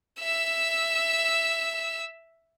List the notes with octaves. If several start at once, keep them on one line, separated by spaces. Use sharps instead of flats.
E5 E6